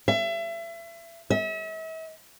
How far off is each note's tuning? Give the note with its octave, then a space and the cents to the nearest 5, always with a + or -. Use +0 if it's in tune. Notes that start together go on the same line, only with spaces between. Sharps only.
E5 +30
E5 -40